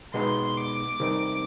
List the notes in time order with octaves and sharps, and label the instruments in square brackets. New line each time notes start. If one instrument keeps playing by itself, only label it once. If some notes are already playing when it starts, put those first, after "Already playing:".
[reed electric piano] B2 G#3 B3 D#4 [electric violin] C6
[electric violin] D6
[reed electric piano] C3 D#3 G3 C4 D#4